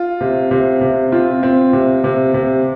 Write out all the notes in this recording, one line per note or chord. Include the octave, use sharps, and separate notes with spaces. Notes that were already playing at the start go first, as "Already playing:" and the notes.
Already playing: F4
C3
C3
C3
C4 F4
C4
C3
C3
C3